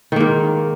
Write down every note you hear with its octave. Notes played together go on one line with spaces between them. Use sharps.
G#2 D#3 A#3